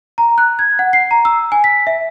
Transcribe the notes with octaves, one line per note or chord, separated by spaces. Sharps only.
A#5
F#6
G#6
F#5
C7
A#5
E6
G#5
B6
E5